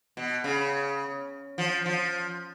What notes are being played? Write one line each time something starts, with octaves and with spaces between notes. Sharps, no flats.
B2
C#3
F3
F3